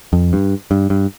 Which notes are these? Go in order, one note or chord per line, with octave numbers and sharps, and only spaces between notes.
F2
G2
G2
G2